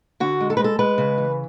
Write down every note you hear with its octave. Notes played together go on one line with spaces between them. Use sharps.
D3 F#4
G#3
A4
G#3 B4
A4
G#3 B4
C#3
E3